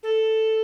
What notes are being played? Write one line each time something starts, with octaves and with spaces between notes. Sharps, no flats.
A4